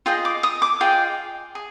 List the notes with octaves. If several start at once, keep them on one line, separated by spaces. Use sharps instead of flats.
F4 G#4 D#5 G5
D6
D#6
D6
F4 G#4 D#5 G5
G#4